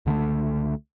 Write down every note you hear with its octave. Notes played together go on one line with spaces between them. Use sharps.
C#2 D3 E3 A3